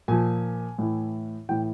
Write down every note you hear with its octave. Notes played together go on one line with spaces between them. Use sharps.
A#2 F3 G#5
A2 E3
A2 E3 G5